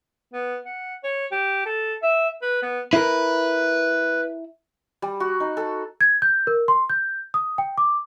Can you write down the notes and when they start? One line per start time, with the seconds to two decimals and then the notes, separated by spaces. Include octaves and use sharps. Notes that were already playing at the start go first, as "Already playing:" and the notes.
0.33 B3
0.65 F#5
1.04 C#5
1.32 G4
1.66 A4
2.02 E5
2.42 B4
2.62 B3
2.93 E4 A#4 B4
5.02 G3
5.20 F#4
5.40 D#4
5.57 A4
6.01 G#6
6.22 G6
6.47 A#4
6.68 C6
6.90 G6
7.34 D#6
7.58 G5
7.78 D6